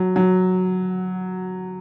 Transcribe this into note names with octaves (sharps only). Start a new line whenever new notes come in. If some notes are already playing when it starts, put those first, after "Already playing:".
Already playing: F#3
F#3